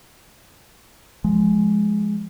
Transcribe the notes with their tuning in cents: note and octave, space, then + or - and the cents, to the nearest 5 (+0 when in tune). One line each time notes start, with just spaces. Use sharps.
F3 +5 G#3 +10